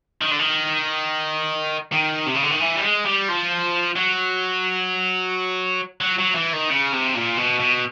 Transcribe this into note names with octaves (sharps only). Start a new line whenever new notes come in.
D#3
D3
D#3
D#3
C3
C#3
D3
D#3
E3
G3
G#3
G3
F3
F#3
F#3
F#3
E3
D#3
C#3
C3
A#2
B2
B2